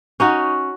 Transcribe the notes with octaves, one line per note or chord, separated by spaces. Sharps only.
C#4 D#4 F#4